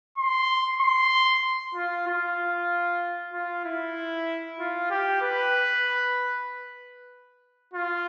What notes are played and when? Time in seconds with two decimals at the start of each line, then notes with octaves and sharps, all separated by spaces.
0.18 C6
0.81 C6
1.75 F4
2.07 F4
3.33 F4
3.65 E4
4.59 F4
4.91 G4
5.22 B4
7.73 F4